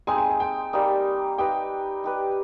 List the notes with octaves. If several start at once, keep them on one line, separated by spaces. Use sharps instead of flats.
G#3 C4 D#4 G#5
G#5
G#5
G5
G3 A#3 D#4
D#4 G4 B4 D#5 G5
D#4 G4 B4